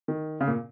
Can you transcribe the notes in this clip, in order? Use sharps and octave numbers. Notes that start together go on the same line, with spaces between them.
D#3
C#3
A#2